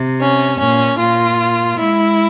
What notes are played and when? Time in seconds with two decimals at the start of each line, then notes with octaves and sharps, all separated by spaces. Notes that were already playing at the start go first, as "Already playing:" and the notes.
Already playing: C3
0.20 C#4
0.59 A#2 C#4
0.99 A#2 F4
1.79 G#3 E4